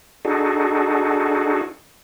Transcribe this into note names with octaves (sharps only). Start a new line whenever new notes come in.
D4 D#4 F#4 G#4 A4